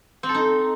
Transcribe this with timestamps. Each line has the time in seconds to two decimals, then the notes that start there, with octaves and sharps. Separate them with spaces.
0.23 C4
0.29 A4
0.34 D#4